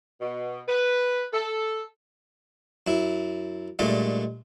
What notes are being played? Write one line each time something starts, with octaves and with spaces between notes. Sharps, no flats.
B2
B4
A4
F#2 E4
G2 A#2 G#3 A3